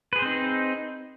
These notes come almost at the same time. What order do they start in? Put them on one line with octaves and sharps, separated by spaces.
B4 G#4 C5 C4 D#4